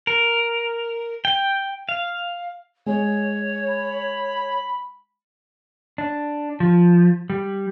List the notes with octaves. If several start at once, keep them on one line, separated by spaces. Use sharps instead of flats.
A#4
G5
F5
G#3 C#5
B5
D4
F3
G3